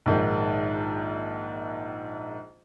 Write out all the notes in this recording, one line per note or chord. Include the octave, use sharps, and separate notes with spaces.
A#1 G#2 D#3